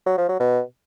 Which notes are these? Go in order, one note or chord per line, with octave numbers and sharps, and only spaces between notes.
F#3
F3
F#3
B2